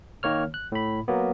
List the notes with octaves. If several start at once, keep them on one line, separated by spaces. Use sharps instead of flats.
D#3 A#3 C#5 F6
F#6
A2 B5
F#3 A#3 B3